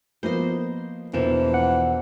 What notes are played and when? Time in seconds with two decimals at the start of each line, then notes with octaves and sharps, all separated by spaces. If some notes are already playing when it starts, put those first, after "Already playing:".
0.23 F3 A#3 B3 C5 D#5 C6
1.14 E1 E3 F3 A#3 E7
1.54 F#5